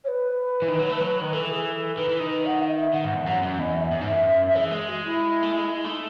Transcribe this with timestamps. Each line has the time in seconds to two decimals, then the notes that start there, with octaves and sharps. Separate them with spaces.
0.04 C#5
0.08 B4
0.62 E3
0.68 D#3
0.79 F#3
0.90 A3
1.00 F#3
1.21 D#3
1.33 E3 A4
1.48 G#4
1.65 A4
1.97 D#3 B4
2.09 E3
2.20 D#3
2.30 B4
2.45 F#5
2.62 D#5
2.77 E5
2.94 D#3 F#5
3.05 G#2
3.15 E2
3.26 F#2 F#5
3.43 F#2
3.58 E2 D#5
3.75 E5
3.91 F#2
4.01 G#2
4.12 F#2
4.55 E3 G#4
4.71 G#3
4.88 F#4
5.04 E4
5.43 A3
5.52 G#3
5.75 E4
5.84 A3 D#4